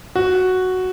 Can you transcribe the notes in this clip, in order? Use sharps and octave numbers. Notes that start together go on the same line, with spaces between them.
F#4